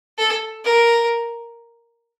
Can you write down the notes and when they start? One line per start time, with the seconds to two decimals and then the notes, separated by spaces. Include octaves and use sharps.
0.18 A4
0.65 A#4